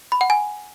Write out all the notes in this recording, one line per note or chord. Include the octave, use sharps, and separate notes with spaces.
B5
F#5
G#5